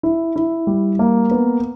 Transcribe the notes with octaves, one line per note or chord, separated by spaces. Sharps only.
E4
E4
G3
A#3
B3